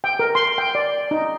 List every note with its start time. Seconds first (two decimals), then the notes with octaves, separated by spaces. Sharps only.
0.04 G5
0.19 A#4
0.35 C6
0.58 G5
0.75 D5
1.11 D#4